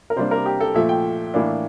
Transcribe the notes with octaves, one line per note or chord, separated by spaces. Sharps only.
A#4
C3 G3 A#3 D4 C5
A#4
G4
A4
A#2 F3 A3 E5
G5
A2 E3 A#3 D4